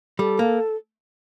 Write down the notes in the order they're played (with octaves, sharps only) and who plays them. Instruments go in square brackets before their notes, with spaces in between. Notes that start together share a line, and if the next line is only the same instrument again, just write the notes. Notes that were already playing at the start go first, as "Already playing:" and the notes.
[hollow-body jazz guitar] G3 [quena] A4
[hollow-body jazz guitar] A#3